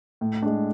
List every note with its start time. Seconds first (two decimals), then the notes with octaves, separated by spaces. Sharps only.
0.21 A2
0.42 G#3 D4